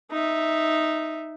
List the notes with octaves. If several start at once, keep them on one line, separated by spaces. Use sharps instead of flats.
D#4 E5